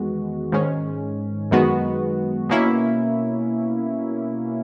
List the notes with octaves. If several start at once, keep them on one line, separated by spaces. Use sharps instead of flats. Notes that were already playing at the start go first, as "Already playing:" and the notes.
Already playing: E2 D#3 G#3 B3 F#4
G#2 D#3 G#3 C#4
F#2 D#3 G#3 B3 F#4
B2 A#3 C#4 E4